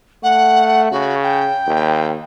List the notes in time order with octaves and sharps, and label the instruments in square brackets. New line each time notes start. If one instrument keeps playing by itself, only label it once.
[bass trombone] A3 [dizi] F#5
[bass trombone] C#3 [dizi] F#4
[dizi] G5
[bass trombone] D#2